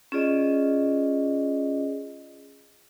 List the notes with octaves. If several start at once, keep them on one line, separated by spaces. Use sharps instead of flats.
C#4 F4 G#4 D5 D#5